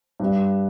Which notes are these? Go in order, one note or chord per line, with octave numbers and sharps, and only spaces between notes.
G2